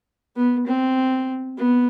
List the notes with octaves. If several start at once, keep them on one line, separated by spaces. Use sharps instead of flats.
B3
C4
B3